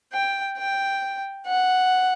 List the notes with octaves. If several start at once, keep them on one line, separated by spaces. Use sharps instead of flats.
G5
G5
F#5